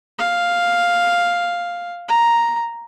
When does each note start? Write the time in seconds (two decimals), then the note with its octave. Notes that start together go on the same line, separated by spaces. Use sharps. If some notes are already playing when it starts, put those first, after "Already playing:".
0.19 F5
2.09 A#5